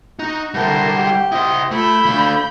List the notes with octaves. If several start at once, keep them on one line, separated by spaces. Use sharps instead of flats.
D#4 F#4
D3 G3 E4 A#4 C5 F#5 A5
G4
E4 C5 D#5
A3 E4 F4 B5 G6
A3 D4 F5